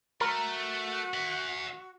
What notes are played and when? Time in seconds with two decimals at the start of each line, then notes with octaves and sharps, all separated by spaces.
0.21 A3 F#4 A#4
1.14 E5 F#5